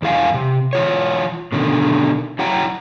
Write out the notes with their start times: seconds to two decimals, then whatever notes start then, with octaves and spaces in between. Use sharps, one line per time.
0.02 E2 E3 E4 F5 F#5 G#5
0.34 C3
0.73 E3 F4 C#5
1.52 B2 D3 D#3
2.39 F#3 E4 F#5 G5 A#5